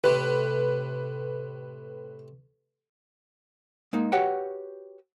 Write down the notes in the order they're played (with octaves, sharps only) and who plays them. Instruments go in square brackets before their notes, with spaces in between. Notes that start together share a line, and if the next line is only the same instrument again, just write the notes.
[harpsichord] A2 C3 [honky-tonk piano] B4
[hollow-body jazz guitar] G#3 A#3 D#4
F#4 G4 B4 C#5 F#5 G5